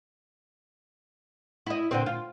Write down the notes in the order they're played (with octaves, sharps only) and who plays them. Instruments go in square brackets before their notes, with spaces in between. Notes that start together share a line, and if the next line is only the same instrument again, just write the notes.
[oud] E4 D#5
A#2 D3 C4
F4